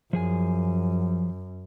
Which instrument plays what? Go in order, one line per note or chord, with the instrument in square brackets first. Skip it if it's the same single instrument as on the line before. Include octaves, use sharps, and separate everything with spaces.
[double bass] F#2 [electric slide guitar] F3 G#4 G#5